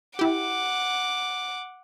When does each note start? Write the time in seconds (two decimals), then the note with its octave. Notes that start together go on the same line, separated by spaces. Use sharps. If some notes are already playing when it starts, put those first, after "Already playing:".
0.19 E4 G4 F#5 D6